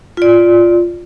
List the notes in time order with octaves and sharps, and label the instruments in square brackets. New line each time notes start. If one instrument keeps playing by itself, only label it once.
[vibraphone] F4 D5